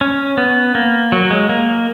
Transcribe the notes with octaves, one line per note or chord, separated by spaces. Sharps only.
C#4
B3
A#3
F#3
G#3
A#3